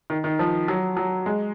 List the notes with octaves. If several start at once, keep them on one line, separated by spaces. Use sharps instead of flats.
D#3
D#3
F3
F#3
F#3
G#3